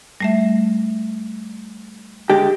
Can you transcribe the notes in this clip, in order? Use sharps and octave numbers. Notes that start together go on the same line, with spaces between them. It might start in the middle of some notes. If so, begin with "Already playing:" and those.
G3 A3 E5
D3 G#3 G4